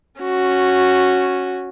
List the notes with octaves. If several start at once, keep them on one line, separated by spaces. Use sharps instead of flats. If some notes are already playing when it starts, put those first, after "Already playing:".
C#4 F#4